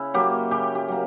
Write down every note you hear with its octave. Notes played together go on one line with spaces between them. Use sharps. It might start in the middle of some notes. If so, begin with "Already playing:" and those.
Already playing: C#3 E4
F#3 A#3 G4
C#3 G4
G4
F#3 A#3